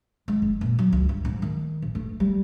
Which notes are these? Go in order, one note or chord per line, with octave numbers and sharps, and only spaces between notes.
G#3
F#1
A#2
F#3
C#2
G2
G#2
D#3
A1
A3
G3